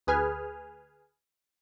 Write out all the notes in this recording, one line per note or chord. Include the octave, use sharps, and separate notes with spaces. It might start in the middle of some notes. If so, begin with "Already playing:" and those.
D2 G#4 B4 G#5 F6